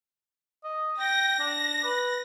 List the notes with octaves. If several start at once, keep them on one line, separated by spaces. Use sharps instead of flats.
D#5
G5 A#6
D4
B4